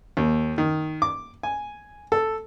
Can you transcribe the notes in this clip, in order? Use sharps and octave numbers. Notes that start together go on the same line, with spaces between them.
D#2
D#3
D6
G#5
A4